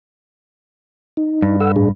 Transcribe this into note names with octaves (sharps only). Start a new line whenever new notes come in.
D#4
G2
A4 F#5 E6
A2 D4 G#4